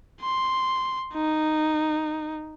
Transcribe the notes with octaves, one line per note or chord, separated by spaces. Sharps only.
C6
D#4